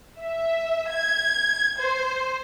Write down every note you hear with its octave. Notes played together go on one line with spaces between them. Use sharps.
E5
G#6
C5